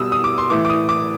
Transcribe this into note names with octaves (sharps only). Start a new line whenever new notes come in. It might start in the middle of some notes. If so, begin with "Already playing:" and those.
Already playing: B2 G3 B3 D#6 E6
D#6
D6
C6
A2 E3 A3 D6
D6
D#6
D6